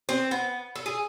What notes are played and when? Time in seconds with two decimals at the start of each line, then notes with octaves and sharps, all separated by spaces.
0.09 C4
0.31 B3
0.76 A4
0.86 G#4